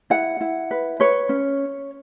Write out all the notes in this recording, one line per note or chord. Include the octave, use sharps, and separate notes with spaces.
E4 F#5
E4
B4
B4 C#5
C#4